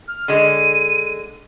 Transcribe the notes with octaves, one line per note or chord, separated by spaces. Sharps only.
F6
D3 G#3 D#7